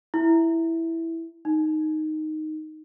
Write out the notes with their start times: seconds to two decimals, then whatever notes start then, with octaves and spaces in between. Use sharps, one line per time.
0.14 E4
1.45 D#4